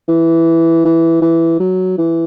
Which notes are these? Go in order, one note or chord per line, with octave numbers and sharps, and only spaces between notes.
E3
E3
E3
F#3
E3